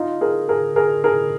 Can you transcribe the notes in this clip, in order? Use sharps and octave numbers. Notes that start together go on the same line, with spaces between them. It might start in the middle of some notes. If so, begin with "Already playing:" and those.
Already playing: D#4 F4
G#4 A#4
G#4 A#4
G#4 A#4
G#4 A#4